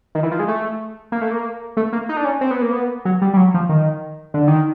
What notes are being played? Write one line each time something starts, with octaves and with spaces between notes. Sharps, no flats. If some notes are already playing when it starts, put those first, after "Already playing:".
D#3
E3
F3
G#3
A3
A#3
A3
A#3
A3
A#3
D#4
D4
C#4
C4
B3
A#3
B3
F#3
G3
G3
F#3
F3
D#3
D3
D#3